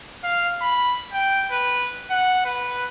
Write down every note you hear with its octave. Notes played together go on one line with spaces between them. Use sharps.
F5
B5
G5
B4
F#5
B4